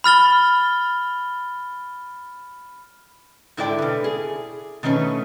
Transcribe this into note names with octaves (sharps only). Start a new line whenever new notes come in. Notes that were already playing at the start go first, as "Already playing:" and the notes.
B5 F6 A6 G7
G#2 D3 E4 A4 D5 G5
B2 B4
G#4
B2 D#3 A3 C#4 B4